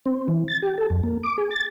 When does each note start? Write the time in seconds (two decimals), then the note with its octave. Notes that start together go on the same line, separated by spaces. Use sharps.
0.06 C4
0.28 E3
0.48 A6
0.62 G4
0.78 A4
0.90 F2
1.03 A#3
1.23 D6
1.38 G#4
1.51 A6